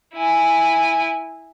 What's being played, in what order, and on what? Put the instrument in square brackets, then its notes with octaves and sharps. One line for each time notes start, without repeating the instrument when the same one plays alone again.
[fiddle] E4 G#5